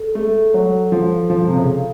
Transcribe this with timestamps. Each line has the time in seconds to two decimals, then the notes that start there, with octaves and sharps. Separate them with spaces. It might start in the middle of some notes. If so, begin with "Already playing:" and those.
Already playing: A4
0.15 A3
0.54 F#3
0.92 F3
1.30 F3
1.47 C3
1.56 C#3